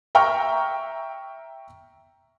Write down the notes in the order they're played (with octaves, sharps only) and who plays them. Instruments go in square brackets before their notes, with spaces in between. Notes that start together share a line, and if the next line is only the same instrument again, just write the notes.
[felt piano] E5 G5 A#5 C#6 F6